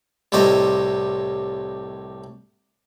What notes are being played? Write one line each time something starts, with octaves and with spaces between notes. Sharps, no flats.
C2 A2 G3 C5 D#5